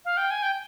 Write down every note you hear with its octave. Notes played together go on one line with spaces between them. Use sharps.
F5
G5
G#5
G5